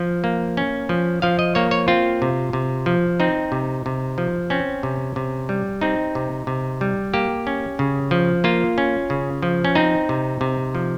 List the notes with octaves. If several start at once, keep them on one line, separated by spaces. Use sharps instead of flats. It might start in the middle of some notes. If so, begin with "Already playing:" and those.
Already playing: F3
A#3
C#4
F3
F3 F5
D#5
A#3 C#5
C#5
C4 F4
C3
C3
F3
C4 D#4
C3
C3
F3
C4 C#4
C3
C3
G3
C4 D#4
C3
C3
G3
A#3 G4
C#4
C#3
F3
A#3 F4
C#4
C#3
F3
C#4
C4 D#4
C3
C3
F3